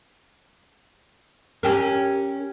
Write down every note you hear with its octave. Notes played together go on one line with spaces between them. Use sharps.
C#4 G4 A#4